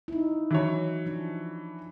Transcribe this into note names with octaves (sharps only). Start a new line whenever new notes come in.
D#4 E4
E3 F#3 C#5
F3 D4